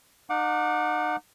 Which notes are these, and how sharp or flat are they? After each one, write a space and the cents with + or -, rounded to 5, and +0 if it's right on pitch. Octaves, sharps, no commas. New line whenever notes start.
D#4 -30 F#5 -30 D6 +0